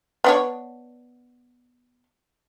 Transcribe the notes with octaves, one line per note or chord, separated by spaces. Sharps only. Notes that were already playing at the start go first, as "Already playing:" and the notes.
B3 D4 C#5